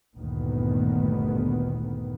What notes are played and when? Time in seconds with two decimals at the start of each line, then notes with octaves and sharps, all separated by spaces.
0.18 G1 D2 A#2 D#3 B3